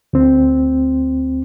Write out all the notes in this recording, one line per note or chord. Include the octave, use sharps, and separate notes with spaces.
D2 C4